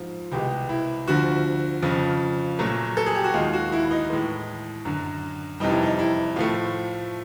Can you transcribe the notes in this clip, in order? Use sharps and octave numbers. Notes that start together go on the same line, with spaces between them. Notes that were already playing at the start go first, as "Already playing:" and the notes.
Already playing: G#2 F3
C2 B2 G#3 G4
E4
D2 D3 F3 F#4
F2 C#3 F3
A#2 F#3 A3
A4
G#4
G4
F#4
D#2 D#3 G#3 F4
F#4
E4
E4
D#4
A2 E3 G#3
F#2 D3 F#3
F2 C3 E3 G3 D#4
E4
D#4
E4
A2 F3 A3 F4